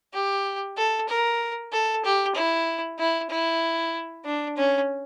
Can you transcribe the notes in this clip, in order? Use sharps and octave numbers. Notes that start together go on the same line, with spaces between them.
G4
A4
A#4
A4
G4
E4
E4
E4
D4
C#4